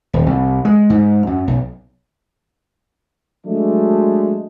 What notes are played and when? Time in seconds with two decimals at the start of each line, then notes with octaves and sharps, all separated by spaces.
0.13 D#1
0.26 C2
0.65 G#3
0.90 G#2
1.27 F#2
1.47 B1
3.46 F#3 G#3 A3 D4